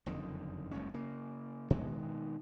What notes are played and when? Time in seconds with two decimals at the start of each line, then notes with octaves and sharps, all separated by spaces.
0.06 F#1 F2 D3 D#3
0.71 F#1 C#2 G2 C#4
0.94 C#3 A#3
1.70 B2 D#3 G#3 B3